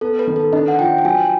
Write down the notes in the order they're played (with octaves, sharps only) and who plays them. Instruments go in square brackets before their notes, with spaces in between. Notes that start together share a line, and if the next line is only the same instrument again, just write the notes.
[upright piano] B3 [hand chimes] A4
[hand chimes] B4
[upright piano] D#3
[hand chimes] A4
[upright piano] D4 [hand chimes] D#5
[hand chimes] F#5
[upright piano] F3 [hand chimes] G5
[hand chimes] G5
[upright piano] F#3 [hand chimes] G#5